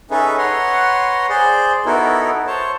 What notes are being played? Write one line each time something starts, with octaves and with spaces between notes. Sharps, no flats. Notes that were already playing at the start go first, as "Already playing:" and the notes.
C#4 D#4 G#4 A4 B4 E5
B4 C#5 F#5 A#5 C6
G#4 C5 D5
B3 D#4 E4 F#4 A4 A#4
C5 C#5 A5